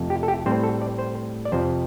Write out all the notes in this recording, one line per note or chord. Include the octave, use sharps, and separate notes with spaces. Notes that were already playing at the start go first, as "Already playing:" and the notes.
Already playing: F2 C3 A3
G4
A4
G4
A2 G3 C4 C5
A4
D5
C5
D5
F2 C3 F3 C5